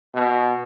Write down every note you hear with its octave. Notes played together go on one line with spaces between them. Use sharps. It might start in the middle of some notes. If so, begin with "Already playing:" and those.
B2